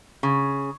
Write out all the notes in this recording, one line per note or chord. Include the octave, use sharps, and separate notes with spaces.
C#3